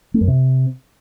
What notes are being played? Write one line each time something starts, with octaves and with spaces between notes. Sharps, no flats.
A3
F#2
C3